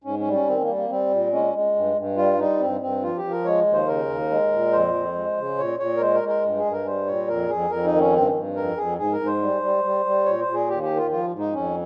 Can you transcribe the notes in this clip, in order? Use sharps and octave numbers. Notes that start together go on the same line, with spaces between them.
G#2 C#4
C#4
G3
C#4
D#3 C4
A#3
G3
A#3
G3 C4
A#2
G#3 C#4
G#3
G2
G2
G3 F4
G3 D#4
G2 C4
G2 C4
F3 F4
G4
F3
A#4
G#3 C#5
D#2
C5
C#3 A#4
D#2
G#3
A#2
F2 C5
F2
G#3
C#3
A#2 C#5
A#2 C#5
A#4
G#3 C5
A#4
G#3
A#4
G2
G#4
G2
A#4
G3 C5
A#2 C#5
F2 A#4
F2 G#4
F2 A#4
D#4
D#3
C#4
G2 C4
G2
F2 A#4
F2 G#4
G#2 G#4
A#4
G#2
C5
G3
G3
G3
G3
A#2 C#5
C5
A#2
G#4
D#2 G4
G4
D#3
F4
F3 F4
G#2
D#4
F2 C#4